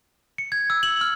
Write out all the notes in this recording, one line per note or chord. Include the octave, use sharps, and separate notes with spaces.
C#7
G#6
E6
F#7
F6